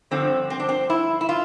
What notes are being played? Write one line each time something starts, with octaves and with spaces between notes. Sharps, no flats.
G2 D3 F3 C4
C4
D4
C4
E4
E4
F4